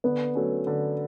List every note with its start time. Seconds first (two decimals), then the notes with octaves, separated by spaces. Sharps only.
0.04 D3 B3
0.35 F#3 A3 C#4
0.67 D3